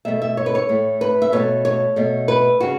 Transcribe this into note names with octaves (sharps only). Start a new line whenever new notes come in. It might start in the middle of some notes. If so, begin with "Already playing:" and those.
B2 A3 E5
E5
C#5
B4
C#5
A2 A3
B4
E5
B2 A3 C#5
C#5
B2 A3
B4
C#3 F#4